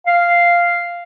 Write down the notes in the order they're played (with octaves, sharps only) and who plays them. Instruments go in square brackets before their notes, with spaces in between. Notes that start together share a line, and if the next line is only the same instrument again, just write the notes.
[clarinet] F5